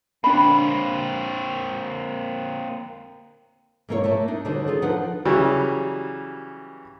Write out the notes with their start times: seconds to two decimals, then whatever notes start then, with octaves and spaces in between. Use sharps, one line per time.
0.24 A#3 C4 D4 B5
3.89 G#2 F3 A#3 E4 A#4 C#5
4.04 A3 A#3 A5
4.28 D4 D#4
4.45 D#2 D3 F#3 G3 D#4 C5
4.67 F4 G#4 A4
4.82 F3 D4 D#4 B4 F#5
5.25 C#3 E3 F#3 G3